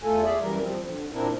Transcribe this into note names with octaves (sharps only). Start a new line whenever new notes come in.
E2 A3 F4 A4 G#5
G#4 D5 E5
F#2 E3 G3 A#4
F3 C4
D3
A#2 C4 D4 E4 A#4